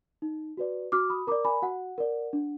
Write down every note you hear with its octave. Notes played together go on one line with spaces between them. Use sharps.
D#4
F#4 B4 D5
F#4 D6 F6
B5 D#6
A#4 D5 A#5 D6
G#5 B5
F#4 F#5
A#4 D5
D4